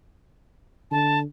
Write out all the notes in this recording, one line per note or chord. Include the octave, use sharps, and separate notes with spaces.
D3 A5